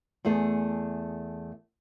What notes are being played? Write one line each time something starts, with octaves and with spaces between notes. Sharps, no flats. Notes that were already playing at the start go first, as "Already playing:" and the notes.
E2 A3 G#4 A4